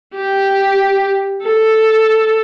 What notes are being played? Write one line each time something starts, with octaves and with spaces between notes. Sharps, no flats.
G4
A4